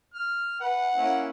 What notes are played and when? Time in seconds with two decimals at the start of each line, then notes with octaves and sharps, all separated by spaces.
0.14 F6
0.61 B4 F#5
0.96 A#3 C#4 E4